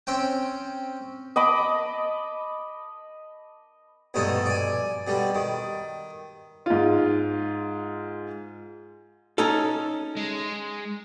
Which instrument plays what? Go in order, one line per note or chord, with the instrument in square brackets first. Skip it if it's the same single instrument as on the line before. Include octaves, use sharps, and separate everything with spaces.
[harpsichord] C4 C#4 G5
[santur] D#5 A5 B5 D6
[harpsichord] A#1 G2 B2 A3 D#4 A5
D5 G#5
B2 D3 G3
D#3
[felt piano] G#2 F4
[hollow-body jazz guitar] C#4 D#4 A4
[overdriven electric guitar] G#3